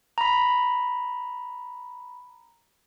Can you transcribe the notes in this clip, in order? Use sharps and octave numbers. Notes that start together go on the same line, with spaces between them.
A#5 B5